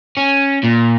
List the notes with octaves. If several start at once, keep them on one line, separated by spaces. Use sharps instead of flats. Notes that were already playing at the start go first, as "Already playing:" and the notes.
C#4
A#2